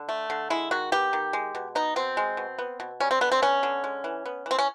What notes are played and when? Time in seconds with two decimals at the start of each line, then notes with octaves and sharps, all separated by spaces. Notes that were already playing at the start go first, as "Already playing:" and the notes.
Already playing: D3
0.09 A3
0.30 D3
0.50 G#3 E4
0.71 D#3 F#4
0.92 B3 G4
1.13 D#3
1.33 G#3
1.55 B2
1.75 B3 D#4
1.96 B2 C4
2.17 G#3
2.37 B2
2.59 B3
2.80 B2
3.00 G3 C#4
3.11 C4
3.21 D3 B3
3.32 C4
3.42 B3 C#4
3.63 D3
3.84 G#3
4.04 E3
4.26 B3
4.46 E3 C4
4.59 C#4